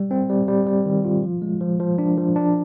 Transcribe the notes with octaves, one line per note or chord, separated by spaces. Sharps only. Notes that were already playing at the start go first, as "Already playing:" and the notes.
Already playing: G3
C4
G3
G3
G3
D#3
F4
F3
G#3
F3
F3
D4
F3
D4